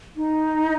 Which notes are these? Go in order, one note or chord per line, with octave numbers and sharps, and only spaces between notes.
D#4